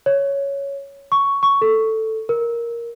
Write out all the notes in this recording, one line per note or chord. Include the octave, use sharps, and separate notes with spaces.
C#5
C#6
C#6
A4
A#4